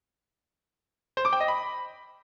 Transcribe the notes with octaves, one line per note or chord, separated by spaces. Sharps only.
C5
D6
G5
D#5
B5